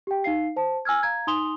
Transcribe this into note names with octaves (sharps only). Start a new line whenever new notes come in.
G4 G5
D#4 F5 C7
C5 A5
G#5 E6 F6 G#6
F5 A#5 G#6
D#4 G#5 C6 D#6 F7 G7